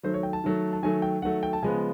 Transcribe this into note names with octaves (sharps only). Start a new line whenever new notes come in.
D#3 F#3 A3 C5
C#5
G5
A5
D#3 F#3 A3
A5
D#3 F#3 A3 G#5
G5
D#3 F#3 A3 F#5
G5
A5
C#3 F3 G#3 B3 G#5